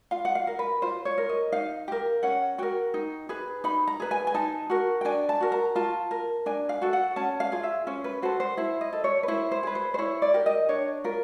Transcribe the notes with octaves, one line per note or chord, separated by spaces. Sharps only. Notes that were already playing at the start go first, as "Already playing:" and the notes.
F4 F5
F#5
F5
A#4
B4
F4 C5
C#5
A#4
D#5
D#4 F5
G4 A#4
C#4 F#5
F#4 A#4 G5
D#4
G#4 B4
D#4 B5
A#5
G#4 B4
G#5
G#5
D#4 A5
F#4 A#4
G5
D4 G#5
A5
F#4 A#4
A#5
F4 A5
A#4
D4 G#5
F5
F#4 A4
F#5
C#4 A5
F5
F4 G#4
E5
C#4 C5
B4
F#4 A4 C5
C5
E4 C5
D#5
A4
C#5
B4
E4 C5
C5
G#4 B4
C5
C5
E4 C#5
D5
G4 A#4
D#5
D4 C#5
F4 A#4